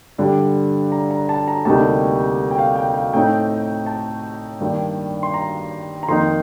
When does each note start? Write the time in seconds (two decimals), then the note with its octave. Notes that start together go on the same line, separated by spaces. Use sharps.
0.18 G2 D3 G3 D4
0.92 A#5
1.11 A#5
1.29 A5
1.48 A#5
1.65 D2 C3 G3 A#3 D#4 A5
2.51 G5
2.58 F5
2.76 G5
2.94 F5
3.14 A2 A3 C4 D#4 G5
3.86 A5
4.60 G2 D#3 A#3 D4
5.23 C6
5.34 A#5
6.03 A#5
6.08 F2 D#3 A#3 D#4 C6